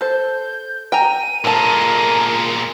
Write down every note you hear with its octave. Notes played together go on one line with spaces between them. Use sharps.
A4 C5 G6
G5 G#5 A#5 D#7
A#2 G#3 A4 A#4 A5